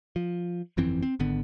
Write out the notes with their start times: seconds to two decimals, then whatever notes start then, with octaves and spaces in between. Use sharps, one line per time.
0.16 F3
0.77 G1 F2 E3 C4
1.03 C4
1.19 G#1 D3 B3